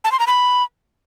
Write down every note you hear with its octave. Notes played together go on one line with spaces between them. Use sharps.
A5
C6
A#5
B5